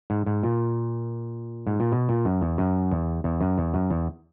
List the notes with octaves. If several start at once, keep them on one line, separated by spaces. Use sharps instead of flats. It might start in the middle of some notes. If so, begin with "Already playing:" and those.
G#2
G#2
A#2
G#2
A#2
B2
A#2
F#2
E2
F#2
E2
E2
F#2
E2
F#2
E2